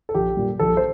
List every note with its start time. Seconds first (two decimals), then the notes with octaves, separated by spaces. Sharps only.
0.09 A4
0.15 A#1 G4
0.37 A#2 G3
0.59 A#1 A4
0.77 C5